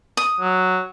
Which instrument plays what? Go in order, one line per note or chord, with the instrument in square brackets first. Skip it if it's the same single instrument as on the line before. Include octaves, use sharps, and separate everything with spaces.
[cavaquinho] D#6
[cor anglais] F#3